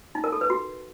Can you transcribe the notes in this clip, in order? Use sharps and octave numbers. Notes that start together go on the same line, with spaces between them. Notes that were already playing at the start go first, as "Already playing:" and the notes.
D#4
A#4
A4
B4
F#4